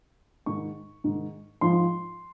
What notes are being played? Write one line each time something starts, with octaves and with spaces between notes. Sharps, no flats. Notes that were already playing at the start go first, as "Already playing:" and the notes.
G#2 D#3 C#6
G#2 D#3
G#2 F3 C6